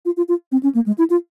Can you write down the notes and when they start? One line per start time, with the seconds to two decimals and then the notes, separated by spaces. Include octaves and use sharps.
0.05 F4
0.17 F4
0.28 F4
0.52 C4
0.63 C#4
0.75 A#3
0.86 G#3
0.98 E4
1.10 F4